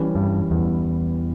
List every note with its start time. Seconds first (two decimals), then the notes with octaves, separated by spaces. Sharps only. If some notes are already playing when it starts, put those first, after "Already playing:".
Already playing: E3 G3 C#4
0.15 G2
0.51 E2